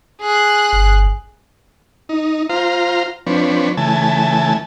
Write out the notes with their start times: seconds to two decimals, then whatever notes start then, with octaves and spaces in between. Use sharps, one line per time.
0.21 G#4 F#6
0.73 G1
2.09 D#4
2.49 F4 C5 F5 A#5
3.27 F3 C4 D4 B4 C#5
3.77 C#3 E3 A3 G#5 A5